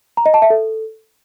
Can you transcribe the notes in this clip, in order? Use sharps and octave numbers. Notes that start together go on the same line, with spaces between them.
A#5
D#5
A5
E5
A4